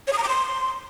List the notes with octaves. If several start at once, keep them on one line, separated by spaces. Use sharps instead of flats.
C#5
D#6
A#5
D6
C6